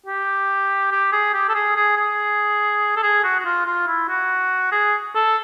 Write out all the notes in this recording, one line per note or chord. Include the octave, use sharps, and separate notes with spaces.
G4
G4
G#4
G4
A4
G#4
G#4
G#4
A4
G#4
F#4
F#4
F4
F4
E4
F#4
G#4
A4